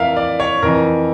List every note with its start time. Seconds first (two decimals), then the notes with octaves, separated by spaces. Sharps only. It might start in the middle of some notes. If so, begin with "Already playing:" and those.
Already playing: F2 E3 A#4 E5 F5
0.17 D5
0.40 C#5
0.62 F2 E3 A#4